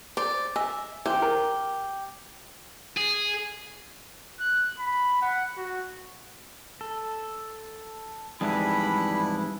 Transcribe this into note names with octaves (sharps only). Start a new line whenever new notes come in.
C5 D5
D#5 E5 G#5
E3 C4 G4
A#4
G#4
F#6
B5
F#5
F#4
A4
F2 G#2 E3 G3 D4 E4 G#4 B5